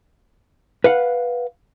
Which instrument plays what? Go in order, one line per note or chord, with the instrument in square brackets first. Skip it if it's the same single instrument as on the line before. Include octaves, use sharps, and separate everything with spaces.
[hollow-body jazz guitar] B4 F5 F#5